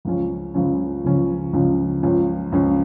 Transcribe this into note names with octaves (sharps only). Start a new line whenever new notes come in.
C#2 C#3 F3 C#4
C#2 C#3 F3 C#4
C#2 C#3 F3 C#4
C#2 C#3 F3 C#4
C#2 C#3 F3 C#4
C#2 C#3 F3 C#4